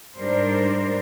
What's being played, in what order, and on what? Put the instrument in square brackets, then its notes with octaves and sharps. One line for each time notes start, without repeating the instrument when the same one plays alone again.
[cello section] G#2 G3 D4 A#4 C5